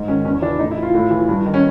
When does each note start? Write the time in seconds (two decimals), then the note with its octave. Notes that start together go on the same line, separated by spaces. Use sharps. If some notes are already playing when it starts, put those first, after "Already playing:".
Already playing: G#2
0.08 D#3 C#4
0.25 E2 C#4
0.42 C#3 E3 D4
0.59 A2 D#4
0.71 E4
0.77 E3
0.82 F4
0.94 A2
1.10 E3
1.29 G2
1.46 D#3
1.54 C#4